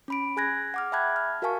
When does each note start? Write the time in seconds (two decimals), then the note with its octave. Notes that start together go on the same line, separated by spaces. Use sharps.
0.08 C#4 B5 D7
0.37 G#4 G#5 F#6 G#6 A#6
0.74 F#5 D6 F6
0.92 E5 G5 A5 B5 F#6 G#6
1.16 F6
1.42 F#4 A#4 F5 G#5 A5 C#6